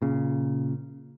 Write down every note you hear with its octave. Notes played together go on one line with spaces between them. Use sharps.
A#2 C#3